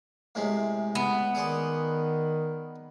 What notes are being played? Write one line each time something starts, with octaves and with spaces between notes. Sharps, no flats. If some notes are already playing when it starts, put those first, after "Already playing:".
A2 C3 G#3
B3
D#3 G#4 D5 C6